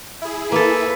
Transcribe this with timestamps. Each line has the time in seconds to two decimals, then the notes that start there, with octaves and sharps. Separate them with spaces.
0.22 E4 G#4
0.52 A#3 A4 B4